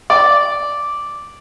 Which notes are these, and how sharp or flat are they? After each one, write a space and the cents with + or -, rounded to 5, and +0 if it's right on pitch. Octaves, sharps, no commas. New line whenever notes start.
D5 -5